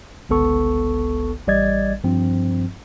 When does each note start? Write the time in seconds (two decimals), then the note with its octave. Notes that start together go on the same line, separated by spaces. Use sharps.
0.29 G1 C#2 B3 A4 C#6
1.47 A1 G3 D5 D#5 G#6 A6
2.04 G2 F3 C4